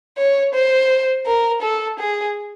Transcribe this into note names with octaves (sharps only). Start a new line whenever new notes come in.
C#5
C5
A#4
A4
G#4